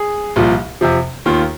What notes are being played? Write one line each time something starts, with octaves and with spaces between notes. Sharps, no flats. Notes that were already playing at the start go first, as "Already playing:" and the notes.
Already playing: G#4
C2 A#2 F3
F2 C3 F3
D#2 D#3 F4